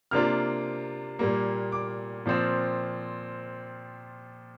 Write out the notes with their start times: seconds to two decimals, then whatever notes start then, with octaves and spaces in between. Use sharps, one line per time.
0.11 C3 A#3 D4 F4 F6
1.19 A#2 G3 A#3
1.72 D6
2.25 A#2 F3 C4 F4